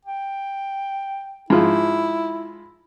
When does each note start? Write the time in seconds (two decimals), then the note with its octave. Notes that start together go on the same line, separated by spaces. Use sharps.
0.05 G5
1.50 G#2 F3 E4